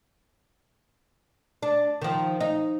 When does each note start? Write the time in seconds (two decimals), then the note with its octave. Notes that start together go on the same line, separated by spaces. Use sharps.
1.63 D4
2.02 D#3 F3
2.41 D#4